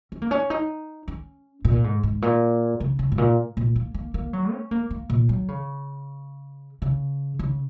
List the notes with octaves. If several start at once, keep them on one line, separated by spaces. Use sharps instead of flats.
C#4
A#3
C#4
D#4
C#4
A#2
G#2
G#2
A#2
C#3
C#3
G#2
A#2
A#2
A#3
A#3
A#3
F#3
C#4
A#3
A#3
A#2
F#3
C#3
C#3
C#3